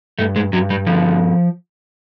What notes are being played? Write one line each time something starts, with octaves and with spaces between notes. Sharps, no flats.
G2 A3
G#3
G2 F#3
G3
D3 F3